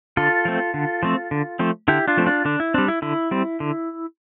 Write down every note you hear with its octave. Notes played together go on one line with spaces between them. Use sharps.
D3 F4 A4
F3 A3 C4
D3
F3 A3 C4
D3
F3 A3 C4
D3 E4 G4
D4 F4
F3 A3 C4
D4 F4
D3 D4
E4
G3 C4 D4
E4
D3 E4
G3 C4
D3